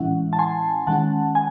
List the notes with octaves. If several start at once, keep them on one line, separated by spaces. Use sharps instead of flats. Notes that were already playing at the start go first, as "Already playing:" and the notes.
Already playing: A2 E3 G#3 C#4 E4 F#5
A5
G#5 C6
D#3 G#3 C#4 F#5 A5
G#5